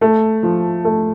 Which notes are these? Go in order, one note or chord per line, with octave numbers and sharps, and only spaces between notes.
A3
F3
A3